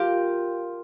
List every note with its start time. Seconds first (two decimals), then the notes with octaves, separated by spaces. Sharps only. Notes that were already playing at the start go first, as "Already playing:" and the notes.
Already playing: F4 G4 A#4